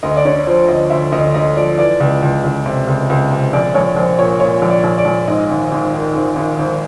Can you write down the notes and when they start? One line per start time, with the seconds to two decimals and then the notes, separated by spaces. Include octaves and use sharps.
0.03 D2 D#5
0.17 D5
0.25 D3 C#5
0.47 F3 C5
0.68 D2 D#5
0.90 D2 E5
1.12 D2 D#5
1.34 D2 D#5
1.56 F3 D5
1.78 E3 D5
2.00 C#2
2.22 C#2
2.44 C#2
2.66 C3
2.87 C#2
3.10 C#2
3.31 C3
3.53 A#1 D5
3.74 A#1 C#5
3.96 A#1 C5
4.18 A#2 C#5
4.40 A#2 C#5
4.62 A#1
4.70 D5
4.84 A#1
4.98 D5
5.05 A#1
5.28 G#2 D#5
5.49 G#1
5.72 G#1
5.93 D#3
6.15 G#1
6.36 G#1
6.59 G#1